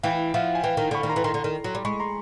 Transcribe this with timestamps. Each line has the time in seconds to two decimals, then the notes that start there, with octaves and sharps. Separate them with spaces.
0.03 E3 F5 G5
0.34 F3 E5 F#5
0.55 G#5
0.64 E3 F5 G5
0.77 D#3
0.91 D3 B5 C#6
1.03 D#3
1.09 A#5 C6
1.16 E3
1.24 D#3 A#5 C6
1.34 D3
1.44 D#3
1.64 F#3
1.75 G3
1.85 G#3 B5 C#6
2.00 A#5 C6